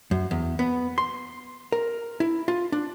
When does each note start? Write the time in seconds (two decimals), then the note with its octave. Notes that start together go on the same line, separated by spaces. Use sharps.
0.11 F#2
0.31 E2
0.59 B3
0.98 C6
1.72 A#4
2.20 E4
2.48 F4
2.72 D4